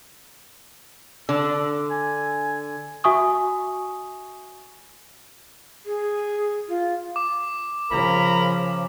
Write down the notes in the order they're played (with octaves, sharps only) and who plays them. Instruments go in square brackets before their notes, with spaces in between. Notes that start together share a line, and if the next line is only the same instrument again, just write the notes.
[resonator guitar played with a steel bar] D3 [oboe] E6
[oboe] G#5
[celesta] F#4 E5 G#5 C#6 D#6
[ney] G#4
F4
[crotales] D6
[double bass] C#3 F3 [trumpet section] A#4 A#5 B5